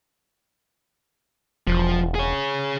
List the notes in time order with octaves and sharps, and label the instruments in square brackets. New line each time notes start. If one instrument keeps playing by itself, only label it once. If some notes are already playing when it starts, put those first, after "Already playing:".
[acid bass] E1 [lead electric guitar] F3
[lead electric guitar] G#4 C#5